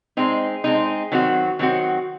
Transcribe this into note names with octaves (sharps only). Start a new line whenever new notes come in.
G#3 C4 D#4
G#3 C4 D#4
D#3 F#3 C4 F#4
D#3 F#3 C4 F#4